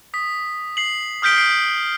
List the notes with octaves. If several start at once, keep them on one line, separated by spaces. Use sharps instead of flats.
D#6 B6
C7 F#7
D#6 F6 G6 B6 D7 G7
C7 D7